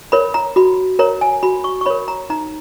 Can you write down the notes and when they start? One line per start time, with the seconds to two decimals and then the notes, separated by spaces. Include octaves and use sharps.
0.12 A#4 C#5 B5
0.34 A#5
0.56 F#4 B5
0.99 A#4 C#5 A#5
1.21 G#5
1.43 F#4 B5
1.64 C#6
1.81 C#6
1.86 A#4 C#5 B5
2.08 A#5
2.30 D#4 A#5